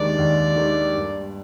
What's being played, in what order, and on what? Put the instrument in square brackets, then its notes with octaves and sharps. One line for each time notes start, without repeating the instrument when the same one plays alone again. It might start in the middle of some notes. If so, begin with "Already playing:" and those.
Already playing: [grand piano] D#2 D#3 G#3 D4 G4 [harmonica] D5
[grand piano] D#2
D#3 G#3 D4 G4
G2